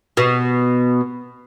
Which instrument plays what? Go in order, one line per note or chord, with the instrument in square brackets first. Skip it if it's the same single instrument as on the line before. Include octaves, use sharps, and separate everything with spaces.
[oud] B2